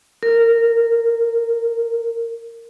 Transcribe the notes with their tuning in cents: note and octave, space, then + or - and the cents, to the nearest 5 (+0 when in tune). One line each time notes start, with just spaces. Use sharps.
A#4 -15